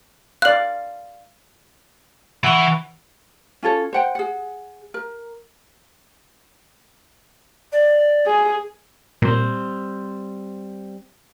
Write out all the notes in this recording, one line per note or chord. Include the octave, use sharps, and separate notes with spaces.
D5 F5 F#6 F#7
E3 F#5 C#6
C#4 F4 A4 C#5
C5 F#5 G5
G#4 F#5
A#4
D5
G#4
A#2 G3 C4 C5